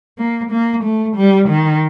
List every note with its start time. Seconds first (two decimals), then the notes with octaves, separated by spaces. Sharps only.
0.19 A#3
0.51 A#3
0.84 A3
1.16 G3
1.49 D#3